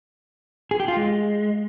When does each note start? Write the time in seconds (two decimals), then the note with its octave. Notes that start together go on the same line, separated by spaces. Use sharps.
0.71 G#4
0.80 G4
0.88 F4
0.97 G#3